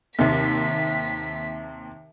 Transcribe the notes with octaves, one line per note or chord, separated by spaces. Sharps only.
D#2 C3 B6